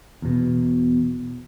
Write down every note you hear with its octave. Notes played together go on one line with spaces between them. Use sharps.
E2 B2